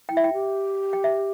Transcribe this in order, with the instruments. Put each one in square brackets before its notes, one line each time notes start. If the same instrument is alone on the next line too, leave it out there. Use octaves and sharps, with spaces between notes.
[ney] E4 [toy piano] G5
[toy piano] E5
G5
[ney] G4
[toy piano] G5
E5